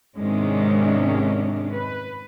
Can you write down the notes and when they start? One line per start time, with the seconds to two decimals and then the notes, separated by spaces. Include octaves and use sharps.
0.17 G#2 C3 D#3 G#3 C#4 D4
1.75 B4